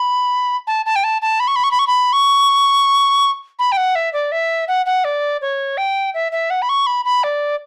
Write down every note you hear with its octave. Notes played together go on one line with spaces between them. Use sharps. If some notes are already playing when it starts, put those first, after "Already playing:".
Already playing: B5
A5
A5
G5
A5
A5
B5
C#6
B5
C#6
B5
C#6
B5
C#6
B5
G5
F#5
E5
D5
E5
F#5
F#5
D5
C#5
G5
E5
E5
F#5
B5
C#6
B5
B5
D5